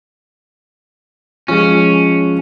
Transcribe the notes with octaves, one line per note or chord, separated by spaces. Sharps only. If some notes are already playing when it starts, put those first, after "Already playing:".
F3 G#3 C#4